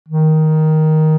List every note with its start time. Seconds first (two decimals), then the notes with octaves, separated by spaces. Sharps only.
0.08 D#3